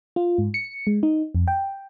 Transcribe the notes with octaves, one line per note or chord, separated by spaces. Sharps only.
F4
G#2
C#7
G#3
D#4
F2
G5